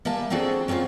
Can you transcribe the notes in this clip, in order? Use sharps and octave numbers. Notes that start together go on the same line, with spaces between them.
G3 A#3 E5 G#5 A5
F#3 C4 D4 F#4 G#4 A4
F#3 C4 C#4 F4 G#4